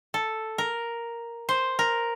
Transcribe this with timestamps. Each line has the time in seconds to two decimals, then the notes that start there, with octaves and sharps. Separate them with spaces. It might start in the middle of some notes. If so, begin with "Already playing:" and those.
0.14 A4
0.58 A#4
1.49 C5
1.79 A#4